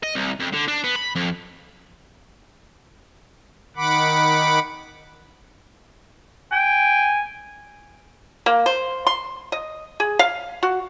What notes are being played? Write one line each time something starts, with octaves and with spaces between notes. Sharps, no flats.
D#5
C2
F2
D3
D4
B3
B5
F2
D#3 F#5 B5 D6
G5 G#5
A#3
C5
C6
D#5
G#4
F5
F#4